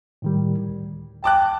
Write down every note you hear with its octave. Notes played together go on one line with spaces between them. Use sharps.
A2 D#3 G3
D2
G5 A5 D6 F#6